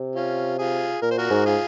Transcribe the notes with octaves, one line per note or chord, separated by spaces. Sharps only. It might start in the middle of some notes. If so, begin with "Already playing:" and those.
Already playing: C3
C#4 F4
F4 G#4
A#2 A#4
C5
F#4 A#4
G#2
F4 G#4